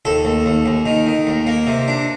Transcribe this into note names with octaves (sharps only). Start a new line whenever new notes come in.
D#2 A4
D#2
D#2
D#2
D#3
D#3
D#2
A#3
C3
D4